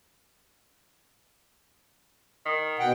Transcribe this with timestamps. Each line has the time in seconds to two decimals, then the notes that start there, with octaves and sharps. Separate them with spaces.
2.46 D#3
2.79 B2 F#5 G5